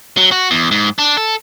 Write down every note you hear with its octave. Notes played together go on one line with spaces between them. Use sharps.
F#3
F#4
E2
G#2
D4
A4